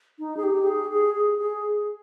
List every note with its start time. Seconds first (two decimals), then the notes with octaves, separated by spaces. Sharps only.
0.19 D#4
0.37 G#4
0.43 G4
0.67 G#4
0.91 G#4
1.15 G#4
1.39 G#4